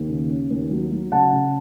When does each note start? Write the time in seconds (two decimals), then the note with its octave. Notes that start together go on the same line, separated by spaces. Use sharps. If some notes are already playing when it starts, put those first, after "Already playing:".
Already playing: D#2
0.09 C#3
0.29 C#4
0.50 D#2
0.71 F#3
0.92 F#3
1.12 C#3 F#5 A5
1.32 C#3